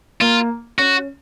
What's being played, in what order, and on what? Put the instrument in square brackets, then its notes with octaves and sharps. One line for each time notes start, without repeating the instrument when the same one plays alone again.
[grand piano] A#3 [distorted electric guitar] F4
[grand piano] C#4 [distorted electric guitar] F#4